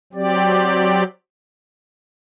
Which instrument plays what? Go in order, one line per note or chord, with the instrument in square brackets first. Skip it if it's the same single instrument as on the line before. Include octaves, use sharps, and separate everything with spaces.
[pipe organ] F#3 C4 G4 D5